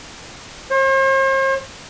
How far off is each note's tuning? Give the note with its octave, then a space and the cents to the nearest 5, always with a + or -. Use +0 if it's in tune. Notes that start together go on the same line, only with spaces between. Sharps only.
C5 +45